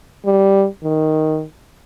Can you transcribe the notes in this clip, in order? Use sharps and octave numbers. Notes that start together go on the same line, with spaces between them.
G3
D#3